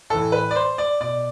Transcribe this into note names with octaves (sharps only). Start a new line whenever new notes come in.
A2 E3 A4
B4
D5
C5
D5
B2 D5